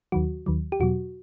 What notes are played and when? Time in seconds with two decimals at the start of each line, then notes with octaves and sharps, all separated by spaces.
0.12 D#2 D#3 F#3 F#4
0.46 D#2 D#3 F#3
0.72 G4
0.80 E2 B2 F#3 F#4